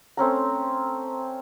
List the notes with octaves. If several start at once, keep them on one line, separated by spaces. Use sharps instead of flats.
A3 C4 C#4 A#5